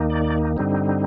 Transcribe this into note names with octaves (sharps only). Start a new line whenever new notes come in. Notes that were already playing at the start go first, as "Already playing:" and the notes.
Already playing: D#2 D#3 A#3 D#4
D5
G2 D3 G3 C4 D#4